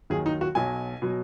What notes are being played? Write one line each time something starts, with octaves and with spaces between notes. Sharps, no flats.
D#2 D#3 F#3 G#4
D#4
F#4
B1 B2 F#3 G#5
B2 F#3